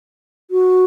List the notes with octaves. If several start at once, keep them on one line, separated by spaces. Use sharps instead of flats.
F#4